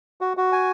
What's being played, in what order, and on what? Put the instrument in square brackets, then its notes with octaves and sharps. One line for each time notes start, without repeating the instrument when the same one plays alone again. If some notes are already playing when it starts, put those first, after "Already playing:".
[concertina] F#4
F#4
G#5